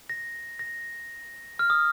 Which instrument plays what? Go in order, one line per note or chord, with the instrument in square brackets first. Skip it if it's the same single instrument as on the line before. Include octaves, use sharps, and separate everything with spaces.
[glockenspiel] A#6
A#6
F6
D#6